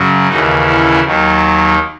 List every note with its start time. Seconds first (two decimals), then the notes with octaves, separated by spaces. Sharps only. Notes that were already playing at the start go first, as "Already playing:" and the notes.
Already playing: F#2 C#3 F#3
0.28 D#2 C#3 E3 D#4 F#4
0.66 C#4 E4
1.03 D#2 D#3 F#3